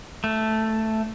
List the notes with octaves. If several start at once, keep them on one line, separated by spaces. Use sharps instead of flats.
A3